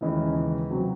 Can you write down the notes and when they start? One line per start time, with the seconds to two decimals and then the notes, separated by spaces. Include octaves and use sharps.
0.01 D#2 C#3 E3 G#3 D#4
0.70 C3 F#3 C4 F#4